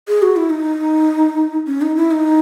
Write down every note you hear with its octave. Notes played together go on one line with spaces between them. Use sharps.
G#4
F#4
E4
D#4
C#4
D#4
E4
D#4